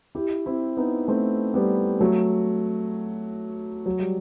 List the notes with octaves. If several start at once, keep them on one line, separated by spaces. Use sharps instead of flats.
E4 G4
C4 E4
B3 D#4
A3 C4
G3 B3
F#3 A3
F#3
G3